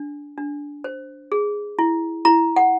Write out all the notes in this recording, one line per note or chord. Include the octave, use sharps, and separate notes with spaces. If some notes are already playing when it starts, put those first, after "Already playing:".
Already playing: D4
D4
C5
G#4
E4
E4 A#5
F#5